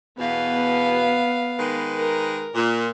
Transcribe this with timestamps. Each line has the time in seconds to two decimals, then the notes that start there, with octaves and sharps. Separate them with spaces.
0.18 E2 B2 B3 F5
1.58 D#3 G#3 B4
1.98 A#4
2.55 A#2